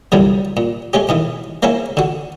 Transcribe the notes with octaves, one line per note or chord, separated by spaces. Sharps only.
C2 F#2 D3 F#3 G3
A#2
G#3 A3 C#4 G4
B2 D#3 E3
G#3 A#3 B3 C#4 E4
D3 F#4